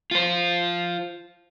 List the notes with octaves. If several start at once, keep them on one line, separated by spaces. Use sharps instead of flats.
F4 C5